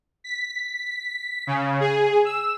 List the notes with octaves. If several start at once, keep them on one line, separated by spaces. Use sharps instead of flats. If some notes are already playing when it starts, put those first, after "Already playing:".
B6
C#3
G#4
E6